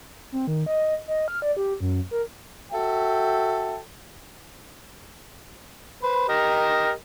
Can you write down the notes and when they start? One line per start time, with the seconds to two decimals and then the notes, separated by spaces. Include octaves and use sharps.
0.32 C4
0.47 D#3
0.66 D#5
1.08 D#5
1.28 F6
1.42 D5
1.57 G4
1.81 F#2
2.11 A#4
2.72 F#4 A4 E5 G5
6.03 B4 C5
6.29 G4 A#4 D#5